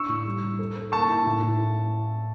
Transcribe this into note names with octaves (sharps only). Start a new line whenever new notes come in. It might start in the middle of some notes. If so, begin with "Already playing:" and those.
Already playing: D4 C#6 E6
A2
G3
G3
A4
A4
A#3 A5 C#6
E4
A2
A2